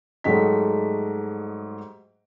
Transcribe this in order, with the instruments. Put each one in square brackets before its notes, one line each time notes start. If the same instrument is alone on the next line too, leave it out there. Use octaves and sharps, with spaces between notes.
[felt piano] G#2 F#3 G3 A3 D#5 B6